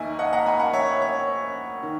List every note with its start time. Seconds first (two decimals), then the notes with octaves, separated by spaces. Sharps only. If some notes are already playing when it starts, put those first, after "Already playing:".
Already playing: D#2 D#3 A#3 D#5 E5 G#5
0.19 D#5 F#5
0.33 F#5 A#5
0.46 G#5 B5
0.59 F#5 A#5
0.73 C#5 E5
1.01 C#5 E5
1.83 D#3